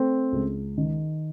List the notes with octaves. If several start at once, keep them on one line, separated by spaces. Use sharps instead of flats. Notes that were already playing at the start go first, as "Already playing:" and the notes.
Already playing: A3 C4
C#2
D#3